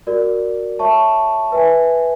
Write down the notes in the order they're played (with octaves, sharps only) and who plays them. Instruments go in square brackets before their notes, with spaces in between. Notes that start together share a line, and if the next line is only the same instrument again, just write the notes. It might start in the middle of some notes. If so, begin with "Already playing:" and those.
[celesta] F#4 A#4 D5
C#5 E5 A5 C#6
B4 E5 G#5